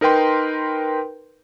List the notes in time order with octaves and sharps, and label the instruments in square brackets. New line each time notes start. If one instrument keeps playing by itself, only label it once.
[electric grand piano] D#4 A#4 B4 G5 C6